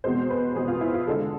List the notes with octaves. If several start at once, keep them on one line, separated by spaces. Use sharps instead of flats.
E2 B2 G#3 C4 C5
B4
E2 B2 G#3 C4 G#4
F4
E4
F4
E2 D3 G#3 A4